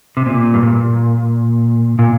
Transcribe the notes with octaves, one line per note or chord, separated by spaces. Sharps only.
C3
A#2
G2
A#2
A#2